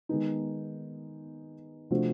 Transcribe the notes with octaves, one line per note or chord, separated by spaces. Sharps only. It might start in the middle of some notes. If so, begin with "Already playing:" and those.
D#3 G#3 B3 D#4
C3 F3 A3 D4 F#4